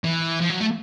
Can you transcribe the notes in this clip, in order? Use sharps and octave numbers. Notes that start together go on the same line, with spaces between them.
E3
F3
F#3
A3